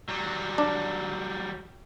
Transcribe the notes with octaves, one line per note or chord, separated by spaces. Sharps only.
F#3 G3
D4